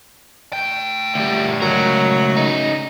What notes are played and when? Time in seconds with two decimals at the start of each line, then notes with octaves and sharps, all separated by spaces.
0.53 A3 G5
1.15 D2 G3
1.62 C#2 F#3 A#4
2.36 C#3 D#4